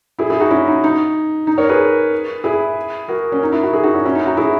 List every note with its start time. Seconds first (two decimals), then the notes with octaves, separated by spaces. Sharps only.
0.19 E4 G#4
0.30 E4 G#4
0.40 D#4 F#4
0.50 C#4 E4
0.67 D#4
0.84 D#4
1.47 D#4
1.58 A#4 C#5
1.69 G#4 B4
2.44 E4 G#4
3.08 F#4 A#4
3.32 C#4
3.43 D#4
3.52 E4
3.63 F#4
3.73 E4 G#4
3.83 D#4 F#4
3.94 C#4 E4
4.05 C#4 E4
4.15 D#4
4.26 D#4 F#4
4.37 E4 G#4